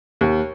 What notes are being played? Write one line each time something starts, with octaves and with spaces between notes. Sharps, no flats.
D#2